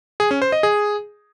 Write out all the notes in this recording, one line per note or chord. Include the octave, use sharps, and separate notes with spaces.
G#4
C#4
C5
D#5
G#4